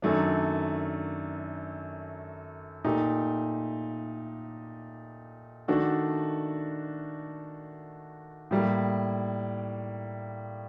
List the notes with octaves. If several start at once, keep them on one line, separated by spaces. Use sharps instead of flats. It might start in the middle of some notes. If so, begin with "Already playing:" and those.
F#2 D#3 F#3 A3 D4
A#2 A3 D#4 G4
D#3 A3 D4 F#4 A4
A2 G3 A#3